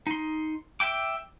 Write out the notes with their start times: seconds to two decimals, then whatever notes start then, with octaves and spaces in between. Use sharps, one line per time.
0.07 D#4 C6
0.80 E5 G5 D6